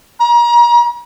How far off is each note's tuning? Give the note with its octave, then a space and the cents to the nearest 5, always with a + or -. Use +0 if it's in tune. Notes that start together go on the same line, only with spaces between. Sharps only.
A#5 +35